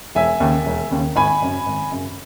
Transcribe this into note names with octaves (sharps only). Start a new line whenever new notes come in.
E1 E5 G#5
D#2 C#3
E1
D#2 C#3
G#1 G#5 B5
F#2 C#3
G#1
F#2 C#3